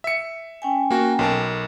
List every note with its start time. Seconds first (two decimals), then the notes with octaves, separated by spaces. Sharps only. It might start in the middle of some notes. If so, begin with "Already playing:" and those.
0.04 E5 C#7
0.62 C#4 G5 G#5
0.90 A#3 F#4
1.19 B1 A#4 A5